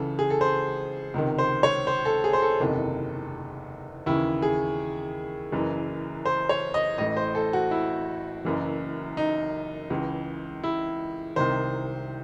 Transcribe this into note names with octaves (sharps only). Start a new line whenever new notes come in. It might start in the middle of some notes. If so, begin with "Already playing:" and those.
Already playing: C#2 C#3 E3 A4
G#4
A4
C5
C#2 C3 D#3
C5
C#5
C5
A4
G#4
C5
A4
F#1 E2 C3 D#3
D#2 C#3 E3 E4
G#4
F#1 F#2 E3
C5
C#5
D#5
A1 A2 E3 D#5
C5
A4
F#4
E4
F#1 F#2 E3
D#4
C#2 C#3 E3
E4
C2 C3 D#3 C5